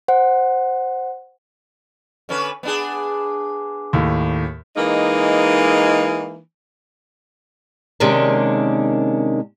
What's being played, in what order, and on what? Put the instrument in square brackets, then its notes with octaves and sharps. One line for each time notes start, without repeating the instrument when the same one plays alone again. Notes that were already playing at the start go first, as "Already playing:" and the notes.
[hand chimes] C5 F#5
[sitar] D3 C#4 B4
B3 D4 G#4
[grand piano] D#2 A2
[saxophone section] E3 G#3 A#3 D#4
[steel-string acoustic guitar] C3 D#3 G#3 A#3 C#4 D4